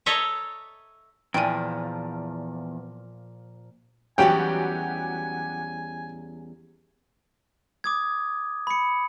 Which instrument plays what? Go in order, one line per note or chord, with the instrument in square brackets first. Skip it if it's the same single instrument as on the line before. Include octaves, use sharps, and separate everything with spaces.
[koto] A4 C#5 D#5 E5 A#5
[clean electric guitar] E2 [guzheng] A#2 F3 [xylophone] G5 G#5
[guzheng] E2 G3 C#4 [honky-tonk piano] F#3 F#4 G4 [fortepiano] G5 [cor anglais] G#5
[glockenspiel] D6 D#6 G#6
B5 C#7